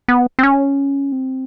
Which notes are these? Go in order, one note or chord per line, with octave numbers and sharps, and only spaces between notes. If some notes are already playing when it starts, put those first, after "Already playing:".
B3
C4
C#4
C4